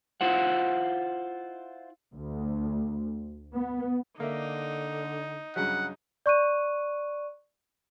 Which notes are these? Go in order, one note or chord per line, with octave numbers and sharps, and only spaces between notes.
E4 F4 C5 F#5
D2
B3
D3 A#3 D#4 E5
G2 C#3 F#3 F#5
D5 C#6 F#6 D#7